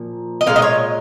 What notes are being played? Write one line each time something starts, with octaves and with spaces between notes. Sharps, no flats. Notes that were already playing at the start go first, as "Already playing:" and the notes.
Already playing: A#2 F3
D#5
A#2 G#3 F5
D#5
C#5